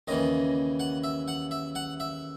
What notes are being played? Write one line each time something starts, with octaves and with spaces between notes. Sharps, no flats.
D#2 C#3 E3 D#5
F#5
E5
F#5
E5
F#5
E5